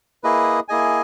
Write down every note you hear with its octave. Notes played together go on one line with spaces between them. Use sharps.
A#3 E4 G#4 B4 D#5
A#3 E4 G#4 D#5 G#5